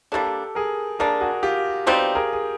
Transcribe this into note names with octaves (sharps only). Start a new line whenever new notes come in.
G3 A#3 D4 G4 A4
G#4 A#4
G3 A#3 D4 G#4 A#4
F#4 G#4
F4 G4
B2 G3 C4 D#4 F4 G4
G#4 A#4
G#4